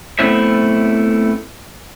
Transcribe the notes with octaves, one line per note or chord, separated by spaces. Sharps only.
A3 B3 C4 E4 C5 E5